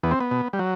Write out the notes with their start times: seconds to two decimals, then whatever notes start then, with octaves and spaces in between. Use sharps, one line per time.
0.03 E2 B3
0.11 C4
0.20 B3
0.31 B2
0.53 G3
0.59 F#3